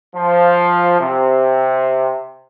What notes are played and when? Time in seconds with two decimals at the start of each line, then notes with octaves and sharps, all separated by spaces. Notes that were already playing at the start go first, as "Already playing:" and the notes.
0.14 F3
1.00 C3